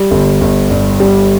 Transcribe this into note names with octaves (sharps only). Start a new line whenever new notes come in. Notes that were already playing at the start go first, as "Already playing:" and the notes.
Already playing: G3
G1
G1
G2
G3